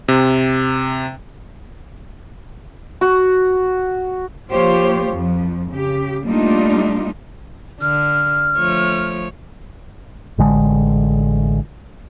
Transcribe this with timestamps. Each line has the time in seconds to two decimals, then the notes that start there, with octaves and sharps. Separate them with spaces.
0.08 C3
3.01 F#4
4.50 F3 A#3 F4 G4 C5 C#5
5.09 F2 F3
5.71 C#3 G4
6.26 G3 A3 A#3 D4 D#4 F4
7.81 D3 F6
8.57 F3 A3 C#5
10.38 A1 D3 G#3